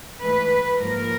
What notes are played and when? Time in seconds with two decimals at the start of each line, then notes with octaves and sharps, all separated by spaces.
0.22 G#2 E3 A3 B4
0.79 G#2 F3 A#3 A#4